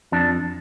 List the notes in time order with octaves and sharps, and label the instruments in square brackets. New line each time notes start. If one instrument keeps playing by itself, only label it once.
[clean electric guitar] F2 D4